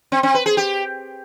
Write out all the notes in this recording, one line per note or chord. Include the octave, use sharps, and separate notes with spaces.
C4
C4
B4
G#4
G4